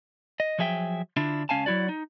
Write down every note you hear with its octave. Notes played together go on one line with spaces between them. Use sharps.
D#5
F3 F#3 G#4 E5 G5
D3 D4 E4 F4
C#2 C#4 F5 G#5 A5
F#3 G#3 E4 F#4 D5
D#4